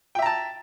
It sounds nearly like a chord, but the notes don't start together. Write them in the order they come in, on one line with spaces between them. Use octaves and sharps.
G5 E5 A#5 A5